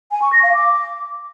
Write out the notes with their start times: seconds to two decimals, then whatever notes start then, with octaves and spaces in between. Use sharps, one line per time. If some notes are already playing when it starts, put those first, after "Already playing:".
0.11 G#5
0.22 C#6
0.33 A#6
0.43 F5
0.54 D6